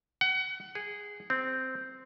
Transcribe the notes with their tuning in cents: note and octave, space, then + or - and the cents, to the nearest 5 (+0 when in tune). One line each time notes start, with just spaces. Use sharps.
F#5 +30
G#4 -10
C4 -10